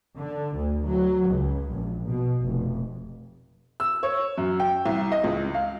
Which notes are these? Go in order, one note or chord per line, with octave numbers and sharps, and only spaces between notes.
D3
D2
F#3
C#2
A#1
B2
F1
E6
C#5
F#2
G5
C2
D#5
C#2
F5